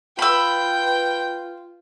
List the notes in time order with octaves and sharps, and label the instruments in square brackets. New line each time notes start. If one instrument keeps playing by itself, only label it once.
[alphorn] F4 [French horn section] B4 [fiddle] G5 [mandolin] B5 E6